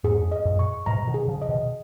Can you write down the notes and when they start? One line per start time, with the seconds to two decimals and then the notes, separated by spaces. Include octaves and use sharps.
0.04 F2 G#2 G#4
0.32 D#5
0.45 F#2 A#2
0.59 C#6
0.86 G#2 B2 A#5
1.07 B2 D#3
1.14 G#4
1.28 C#3 F3
1.42 D#5
1.49 B2 D#3